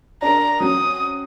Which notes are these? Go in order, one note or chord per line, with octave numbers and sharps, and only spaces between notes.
D4 A#4 A#5
F#3 C4 C#4 D#6